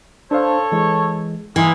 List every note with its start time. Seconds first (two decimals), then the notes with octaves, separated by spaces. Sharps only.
0.31 D4 A4 C5 C#5 F5
0.72 E3 G#3
1.56 A#2 E3 G#3 A#3